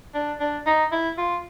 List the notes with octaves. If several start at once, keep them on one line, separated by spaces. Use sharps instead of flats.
D4
D4
D#4
E4
F4